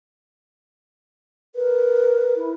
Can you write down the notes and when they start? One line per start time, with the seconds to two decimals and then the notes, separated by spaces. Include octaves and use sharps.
1.55 A#4 B4
2.36 E4